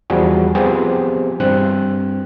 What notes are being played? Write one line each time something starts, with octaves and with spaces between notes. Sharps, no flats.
E2 F3 G3 F#4 G#4
F3 B3 C4 G4 G#4 C5
G2 C4 F#6